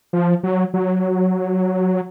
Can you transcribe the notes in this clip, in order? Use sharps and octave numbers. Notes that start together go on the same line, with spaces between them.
F3
F#3
F#3